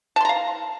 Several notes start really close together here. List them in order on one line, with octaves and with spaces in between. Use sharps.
A5 C6 A#5 F5